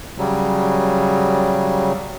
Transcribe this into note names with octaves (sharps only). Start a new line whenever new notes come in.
C#3 F#3 G3